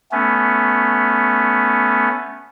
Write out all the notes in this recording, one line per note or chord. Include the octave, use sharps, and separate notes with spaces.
A3 B3 C#4